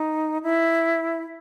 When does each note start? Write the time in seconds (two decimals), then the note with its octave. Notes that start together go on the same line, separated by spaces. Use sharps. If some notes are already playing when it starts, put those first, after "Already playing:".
Already playing: D#4
0.43 E4